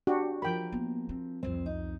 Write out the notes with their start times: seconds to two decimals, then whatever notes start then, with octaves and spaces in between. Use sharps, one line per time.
0.07 D4 F#4 G4
0.42 F3 A#4 G5 B5
0.72 A#3 B3
1.09 C4
1.43 C2 F2 C4
1.66 D#4